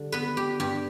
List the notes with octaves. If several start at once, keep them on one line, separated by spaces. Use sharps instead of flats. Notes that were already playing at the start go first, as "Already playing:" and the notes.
Already playing: D3 G3
B3 B4
G4
G2 G4